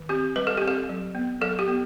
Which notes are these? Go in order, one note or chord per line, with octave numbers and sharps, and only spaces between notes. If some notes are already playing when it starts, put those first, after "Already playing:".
Already playing: D#3
C4 G4
G3 B4
A4
C4 G4
A4
F#3
B3
F#3 A4
G4
B3